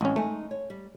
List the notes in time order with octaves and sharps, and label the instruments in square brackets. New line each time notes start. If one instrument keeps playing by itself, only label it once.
[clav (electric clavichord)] A1 C#4 [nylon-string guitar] G#3 C4 B4
[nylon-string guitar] G#3 D#4 G#5 [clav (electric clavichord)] A3
[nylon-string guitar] C#5
G3